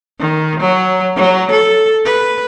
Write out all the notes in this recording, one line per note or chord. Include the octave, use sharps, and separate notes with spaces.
D#3
F#3
F#3
A4
B4